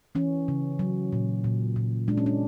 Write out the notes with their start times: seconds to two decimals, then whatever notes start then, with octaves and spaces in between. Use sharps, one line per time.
0.15 E3 C#4
0.48 C#3
0.79 F#3
1.13 A#2
1.44 A#2
1.76 A#2
2.08 G#3 D4
2.17 C#4
2.26 D4